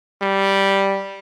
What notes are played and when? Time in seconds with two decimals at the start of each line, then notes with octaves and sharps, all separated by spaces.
0.22 G3